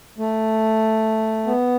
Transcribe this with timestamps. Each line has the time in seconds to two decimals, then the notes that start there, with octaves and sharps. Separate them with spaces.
0.18 A3
1.46 B3